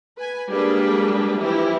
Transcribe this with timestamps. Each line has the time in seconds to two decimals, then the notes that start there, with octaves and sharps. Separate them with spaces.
0.17 B4 G#5
0.50 G3 G#3 A#3 D4 G#4 B4
1.40 E3 F3 E4 G4